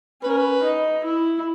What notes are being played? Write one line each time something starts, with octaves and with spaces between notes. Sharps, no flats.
C#4 B4
A#4
B4
D#4
E4